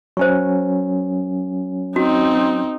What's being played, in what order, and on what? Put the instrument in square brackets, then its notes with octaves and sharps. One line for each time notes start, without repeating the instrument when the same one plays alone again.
[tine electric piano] F#3 C#4 [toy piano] C5 C#6
[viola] C4 D#4 [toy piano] F#4